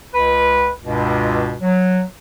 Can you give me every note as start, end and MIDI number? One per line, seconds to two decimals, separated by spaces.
0.13 0.69 37
0.13 0.69 71
0.81 1.55 37
0.81 1.55 43
0.81 1.55 47
1.61 2.01 54